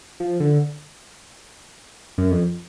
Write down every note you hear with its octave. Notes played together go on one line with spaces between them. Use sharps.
F3
D3
F#2
F2